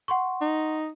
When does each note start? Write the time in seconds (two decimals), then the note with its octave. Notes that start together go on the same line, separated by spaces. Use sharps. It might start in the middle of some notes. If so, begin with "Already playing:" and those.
0.08 F#5 C6 C#6
0.41 D#4